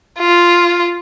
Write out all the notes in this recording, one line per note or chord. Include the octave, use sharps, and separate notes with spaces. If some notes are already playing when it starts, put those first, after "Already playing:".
F4